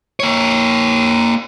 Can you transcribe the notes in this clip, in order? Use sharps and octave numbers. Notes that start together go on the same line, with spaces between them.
A#3 C#5